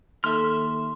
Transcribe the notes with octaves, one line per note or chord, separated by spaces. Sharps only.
D#2 A4 E5 C6 F6